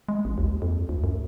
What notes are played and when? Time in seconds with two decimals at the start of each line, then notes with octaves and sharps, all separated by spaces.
0.09 G#3
0.25 A1
0.38 D#2
0.62 F2
0.89 D2
1.04 F#2